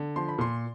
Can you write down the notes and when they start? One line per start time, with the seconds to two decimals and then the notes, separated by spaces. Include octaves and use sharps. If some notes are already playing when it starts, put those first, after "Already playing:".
Already playing: D3
0.16 F3 C6
0.28 B5
0.38 A#2 C6